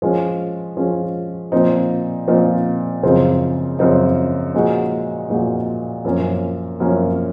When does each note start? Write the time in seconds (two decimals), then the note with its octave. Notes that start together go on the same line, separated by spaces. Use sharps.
0.02 F3 G#3 C#4
0.77 F3 G#3 C#4
1.52 A#2 F3 C4 D#4
2.28 A#2 F3 C4 D#4
3.03 F#2 C#3 F3 C4 D#4
3.79 F#2 C#3 F3 C4 D#4
4.54 A#2 F3 G#3 D#4 F#4
5.30 A#2 F3 G#3 D#4 F#4
6.05 F#2 F3 A#3 C#4
6.80 F#2 F3 A#3 C#4